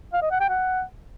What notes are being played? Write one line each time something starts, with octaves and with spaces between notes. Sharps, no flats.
F5
D#5
F#5
G5
F#5